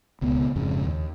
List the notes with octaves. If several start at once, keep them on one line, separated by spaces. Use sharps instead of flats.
D1 C#2 B2 B3
E1 F2 G#2 C#3
D#2